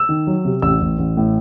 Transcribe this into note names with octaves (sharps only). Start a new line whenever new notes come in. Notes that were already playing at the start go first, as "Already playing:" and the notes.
Already playing: E6
D#3
F#3
C3
A1 E6
A1
A1
A2